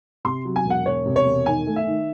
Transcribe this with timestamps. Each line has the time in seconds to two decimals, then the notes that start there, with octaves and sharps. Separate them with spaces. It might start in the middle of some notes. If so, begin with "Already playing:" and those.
0.25 C3 C6
0.45 F#3
0.56 G#5
0.65 E1
0.70 F#5
0.86 E1 C#5
1.06 C3
1.16 C#5
1.26 E1
1.46 D#3 G#5
1.66 A3
1.76 E5
1.87 D#3